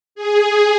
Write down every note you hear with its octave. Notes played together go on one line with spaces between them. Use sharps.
G#4